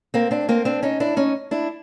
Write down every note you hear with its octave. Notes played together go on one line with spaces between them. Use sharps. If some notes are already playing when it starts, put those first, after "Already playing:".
A#3 C4
C4 D4
A#3 C4
C4 D4
C#4 D#4
D4 E4
C#4 D#4
D4 E4